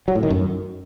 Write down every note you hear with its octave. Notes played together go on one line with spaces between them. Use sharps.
F#3
A2
D#3
F#2